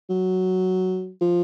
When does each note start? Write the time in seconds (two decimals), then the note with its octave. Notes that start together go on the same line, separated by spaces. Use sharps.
0.10 F#3
1.21 F3